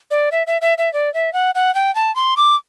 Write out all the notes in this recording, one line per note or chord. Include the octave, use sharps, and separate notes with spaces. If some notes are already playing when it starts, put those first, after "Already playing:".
D5
E5
E5
E5
E5
D5
E5
F#5
F#5
G5
A5
C6
D6